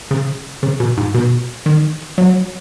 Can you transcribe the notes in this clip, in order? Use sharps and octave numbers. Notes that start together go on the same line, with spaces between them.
C#3
C#3
B2
G#2
B2
D#3
F#3